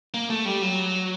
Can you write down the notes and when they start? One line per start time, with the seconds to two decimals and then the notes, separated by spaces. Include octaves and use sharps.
0.14 A#3
0.30 A3
0.45 G3
0.62 F#3